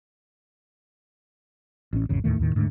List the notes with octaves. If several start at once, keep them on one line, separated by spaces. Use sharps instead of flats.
A1 C#4
G#1 E2 C#3
D#2 A2 D#3 A3
D#2 A2 D#3
D#1 G#2 D3 A3